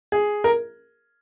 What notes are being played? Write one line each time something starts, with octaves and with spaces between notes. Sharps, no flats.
G#4
A#4